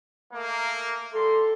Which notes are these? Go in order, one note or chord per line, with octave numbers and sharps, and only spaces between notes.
A3 A#3 A#4
G3 A4 C6